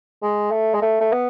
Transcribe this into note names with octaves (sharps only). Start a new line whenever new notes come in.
G#3
A3
G#3
A3
A3
B3